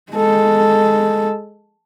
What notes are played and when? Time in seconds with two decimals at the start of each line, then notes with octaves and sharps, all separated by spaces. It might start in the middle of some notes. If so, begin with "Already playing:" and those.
0.12 G#3 A4